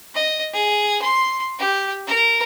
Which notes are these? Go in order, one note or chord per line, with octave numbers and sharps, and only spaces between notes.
D#5
G#4
C6
G4
A#4